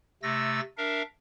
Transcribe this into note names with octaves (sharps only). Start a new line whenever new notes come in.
C3 A3 E6 A6 A#6
D4 A#4 E5 F5